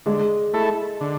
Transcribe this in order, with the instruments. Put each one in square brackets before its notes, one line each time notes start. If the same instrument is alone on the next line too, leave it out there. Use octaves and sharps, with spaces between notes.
[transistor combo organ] D3 [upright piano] G#3
[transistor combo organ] A3 E4 A4
D3